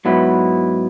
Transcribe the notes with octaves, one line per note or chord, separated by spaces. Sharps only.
G#2 F#3 B3 E4 B4